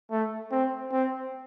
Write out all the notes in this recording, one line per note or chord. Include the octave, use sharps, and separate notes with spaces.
A3
C4
C4